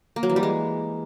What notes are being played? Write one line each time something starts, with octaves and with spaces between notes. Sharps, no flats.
A#3
F#3
E3
G3
G#3